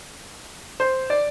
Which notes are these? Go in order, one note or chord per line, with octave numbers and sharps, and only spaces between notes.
C5
D5